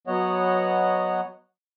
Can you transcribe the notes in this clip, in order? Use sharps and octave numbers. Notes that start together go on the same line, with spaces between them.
F#3 B3 C#5 D#5 F#5